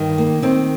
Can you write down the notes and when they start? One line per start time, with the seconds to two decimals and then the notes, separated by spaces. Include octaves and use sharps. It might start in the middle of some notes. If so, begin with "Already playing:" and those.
Already playing: G2 D#3
0.18 A#3
0.42 D#3 C4